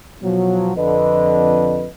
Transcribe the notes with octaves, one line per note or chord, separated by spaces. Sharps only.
B2 F3 F#3
F2 D3 B4 D#5